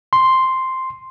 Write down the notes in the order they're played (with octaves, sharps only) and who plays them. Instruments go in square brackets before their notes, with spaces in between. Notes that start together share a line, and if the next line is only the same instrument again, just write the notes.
[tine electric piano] C6